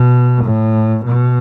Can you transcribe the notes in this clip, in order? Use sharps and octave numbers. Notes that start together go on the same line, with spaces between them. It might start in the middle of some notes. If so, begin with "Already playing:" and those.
Already playing: B2
A2
B2